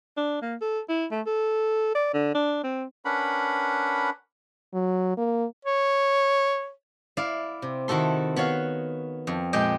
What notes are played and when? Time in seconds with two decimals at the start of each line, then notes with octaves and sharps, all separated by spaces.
0.17 D4
0.42 A#3
0.61 A4
0.89 E4
1.11 A3
1.27 A4
1.95 D5
2.14 D3
2.35 D4
2.64 C4
3.05 C#4 D4 A#4 B4 F#5 B5
4.74 F#3
5.17 A#3
5.65 C#5
7.17 E4 D5 F5
7.62 C3
7.88 D#3 E4 F#4 A4 C6
8.36 B3 F#4 C#5 F5
9.27 F2
9.53 A#2 G#3 G4 D#5 G5